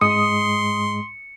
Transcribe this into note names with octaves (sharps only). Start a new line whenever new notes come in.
G#2 G#3 C6 D#6 C#7